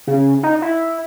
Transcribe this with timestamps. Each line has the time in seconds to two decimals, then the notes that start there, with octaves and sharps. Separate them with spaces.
0.07 C#3
0.43 D#4
0.62 E4